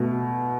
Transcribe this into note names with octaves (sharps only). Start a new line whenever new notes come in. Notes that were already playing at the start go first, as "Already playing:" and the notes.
Already playing: B2 A3